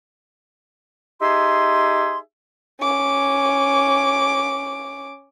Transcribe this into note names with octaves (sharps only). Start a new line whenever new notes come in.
D#4 G4 G#4 E5 C6
C#4 D6